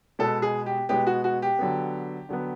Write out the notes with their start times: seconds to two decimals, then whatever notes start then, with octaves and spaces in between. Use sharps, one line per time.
0.19 B2 G#3 B3 A4
0.42 G#4
0.66 G4
0.89 B2 G#3 B3 G4
1.07 F#4
1.24 F#4
1.42 G4
1.59 D3 F#3 B3
2.29 D3 F#3 B3